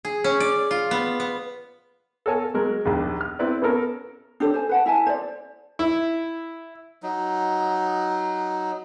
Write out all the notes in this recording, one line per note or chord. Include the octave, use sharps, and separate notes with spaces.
G#4
C#4
D5
F4
B3
B3
A4 A#4 C#5 G#5 A5
F#3 G#3 A#4
A#1 D#2
F6
C4 E4 B4 D5
B3 C#4 A4 A#4
D4 G4 A4 C#5
C5 G#5
B4 F#5 A5
E4 E5 G#5 A5
C5 D5
E4
F#3 D#4